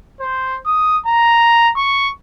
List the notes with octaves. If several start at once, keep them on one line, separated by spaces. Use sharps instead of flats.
C5
D#6
A#5
C#6